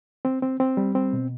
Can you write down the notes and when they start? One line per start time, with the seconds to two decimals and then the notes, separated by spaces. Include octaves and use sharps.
0.25 C4
0.42 C4
0.60 C4
0.77 G3
0.95 C4
1.13 B2